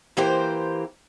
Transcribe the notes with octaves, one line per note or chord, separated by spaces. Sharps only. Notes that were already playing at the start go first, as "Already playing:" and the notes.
E3 A#3 G4 C5